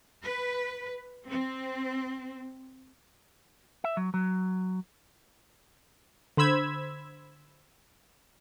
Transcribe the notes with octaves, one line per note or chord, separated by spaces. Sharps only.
B4
C4
E5
F#3
F#3
D3 C5 B5 E6 G#6